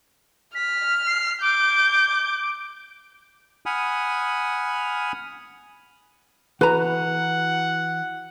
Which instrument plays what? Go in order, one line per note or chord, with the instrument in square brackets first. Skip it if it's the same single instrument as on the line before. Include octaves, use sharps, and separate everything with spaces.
[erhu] F6 [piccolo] B6
[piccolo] C7
[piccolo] D6 [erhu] G6
[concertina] F#5 G#5 B5 D#6 F6
[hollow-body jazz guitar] E3 F#4 [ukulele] B4 A#5 [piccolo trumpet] F#5